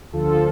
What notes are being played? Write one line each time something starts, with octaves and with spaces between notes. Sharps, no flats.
D2 D3 F3 F4 A4